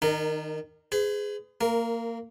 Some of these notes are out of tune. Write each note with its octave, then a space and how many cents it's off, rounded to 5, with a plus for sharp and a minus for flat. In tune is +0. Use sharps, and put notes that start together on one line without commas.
D#3 +0 D#4 -45 A#4 -10
G#4 +0 B4 +45
A#3 -20 A#4 +5